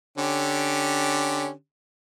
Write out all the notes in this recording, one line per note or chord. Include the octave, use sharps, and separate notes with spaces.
D3 C#4 G4